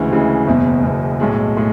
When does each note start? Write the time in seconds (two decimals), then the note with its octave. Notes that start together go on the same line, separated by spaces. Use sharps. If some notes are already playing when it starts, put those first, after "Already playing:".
Already playing: D2 C#3 E3 G#3
0.11 D2 C#3 E3 G#3
0.47 F#1 E2 B2
0.83 F#1 E2 B2
1.20 B1 A2 G#3
1.57 A2 G#3